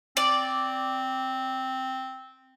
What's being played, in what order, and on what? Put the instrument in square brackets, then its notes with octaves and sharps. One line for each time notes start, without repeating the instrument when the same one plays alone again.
[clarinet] C4 [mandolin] D5